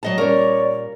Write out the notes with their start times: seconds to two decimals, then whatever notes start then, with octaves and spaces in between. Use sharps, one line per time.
0.03 F#3 D#5 A5
0.18 A#2 G3 C#4 A#4 C#5 D5